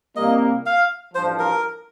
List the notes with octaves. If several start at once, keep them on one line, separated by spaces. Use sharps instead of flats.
C2 C3 G3 A#3 D#5
F5
A1 G2 F3 C5
A#4